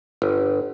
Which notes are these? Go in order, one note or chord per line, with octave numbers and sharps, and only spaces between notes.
G1